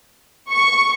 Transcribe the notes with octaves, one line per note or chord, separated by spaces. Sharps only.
C#6